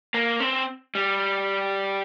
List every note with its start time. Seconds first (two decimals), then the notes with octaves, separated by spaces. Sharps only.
0.14 A#3
0.40 C4
0.95 G3